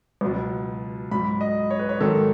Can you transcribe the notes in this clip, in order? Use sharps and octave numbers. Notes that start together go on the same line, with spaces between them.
C#2 B2 F#3
G#2 F#3 B5
D#5
C#5
B4
C#5
G#2 D#3 F#3 A4